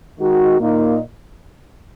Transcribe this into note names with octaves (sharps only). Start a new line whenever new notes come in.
D#3 G#3 D#4 F#4
A#2 A#3 D#4